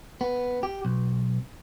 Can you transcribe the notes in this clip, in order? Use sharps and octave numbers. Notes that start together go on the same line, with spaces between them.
B3
G4
B1